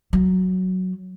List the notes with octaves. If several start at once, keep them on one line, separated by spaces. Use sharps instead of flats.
F#3